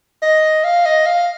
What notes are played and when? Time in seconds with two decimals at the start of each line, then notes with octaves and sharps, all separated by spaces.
0.22 D#5
0.64 F5
0.85 D#5
1.06 F5